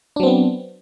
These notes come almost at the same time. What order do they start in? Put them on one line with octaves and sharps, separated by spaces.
D4 F#3 C4 B3